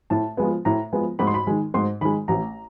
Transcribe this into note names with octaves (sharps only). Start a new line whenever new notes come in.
A2 A5
F3 G#3 B3
A2 A#5
F3 G#3 B3
G#2 B5
C6
B5
D#3 G#3
G#2 C6
D#3 G#3 B5
A1 A#5